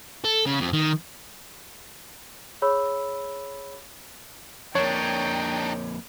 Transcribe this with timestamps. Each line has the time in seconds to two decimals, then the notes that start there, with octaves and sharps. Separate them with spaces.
0.24 A4
0.46 C#3
0.60 F2
0.73 D#3
2.62 G#4 C#5 B5 E6
4.75 F2 A#3 D4 D#4 C#5 G5